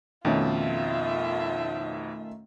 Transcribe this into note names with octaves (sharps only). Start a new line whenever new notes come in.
F2 B2 D#3 A3 C#4 F4 E5